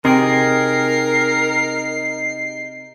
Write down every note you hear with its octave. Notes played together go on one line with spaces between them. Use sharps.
C3 D#4 G#4 A#4 G5 C7